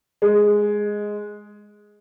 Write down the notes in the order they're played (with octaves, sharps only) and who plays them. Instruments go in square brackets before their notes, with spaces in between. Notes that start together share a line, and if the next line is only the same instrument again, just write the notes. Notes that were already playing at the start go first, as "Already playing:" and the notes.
[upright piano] G#3